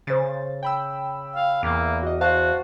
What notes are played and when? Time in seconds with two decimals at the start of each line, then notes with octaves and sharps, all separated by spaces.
0.07 C#3 C5 A6
0.63 G5 B5 E6
1.36 F5
1.63 E2 A#3
2.03 F#4 D#5
2.21 F#4 C5 F5 A5